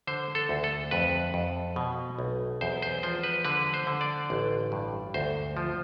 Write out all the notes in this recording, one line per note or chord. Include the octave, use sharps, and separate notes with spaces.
D3 C5
A4
D2
A4
F2 B4
F2
B2
B1
E2 C5
C5
F3 C5
B4
D3 B4
C5
D3
D5
A1
G2
D2 C5
F3